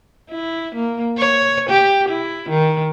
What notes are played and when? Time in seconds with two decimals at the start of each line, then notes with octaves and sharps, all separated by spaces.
0.30 E4
0.75 A#3
1.18 C#5
1.70 G4
2.09 E4
2.49 D#3